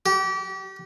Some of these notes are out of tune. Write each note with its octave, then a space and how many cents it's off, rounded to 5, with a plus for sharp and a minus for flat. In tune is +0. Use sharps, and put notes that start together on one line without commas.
G4 -30